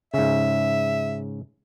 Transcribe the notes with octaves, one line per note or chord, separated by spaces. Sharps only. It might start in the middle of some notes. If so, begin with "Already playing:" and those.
G#2 C#3 E5